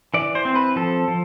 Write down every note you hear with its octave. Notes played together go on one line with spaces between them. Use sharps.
E3 D5
C5
C4
B4
F3 A4
F3